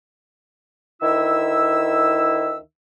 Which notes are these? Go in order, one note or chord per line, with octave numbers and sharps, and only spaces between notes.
D2 D#3 E4 E5 E6